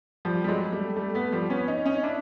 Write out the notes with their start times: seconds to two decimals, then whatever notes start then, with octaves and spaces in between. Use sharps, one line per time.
0.25 F3 G3
0.44 G3
0.48 F#3 G#3
0.72 G3 A3
0.96 G3 A3
1.14 A3 B3
1.32 F3 G3
1.50 B3 C#4
1.68 C#4 D#4
1.86 C#4 D#4
2.03 D4 E4